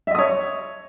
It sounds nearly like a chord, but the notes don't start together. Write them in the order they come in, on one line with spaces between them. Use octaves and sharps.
E5 D#5 D#6 C#5